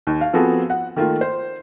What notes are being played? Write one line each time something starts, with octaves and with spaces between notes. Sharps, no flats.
D#2
F5
F3 B3 C4 F#4 G#4 A4
F#5
D#3 A3 A#3 F4
C5